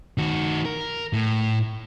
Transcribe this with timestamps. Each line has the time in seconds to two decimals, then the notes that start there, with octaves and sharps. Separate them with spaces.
0.18 D#3 F#4
0.65 A#4
1.13 A2